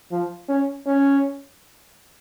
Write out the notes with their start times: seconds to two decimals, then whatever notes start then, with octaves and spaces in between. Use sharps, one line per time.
0.11 F3
0.48 C#4
0.86 C#4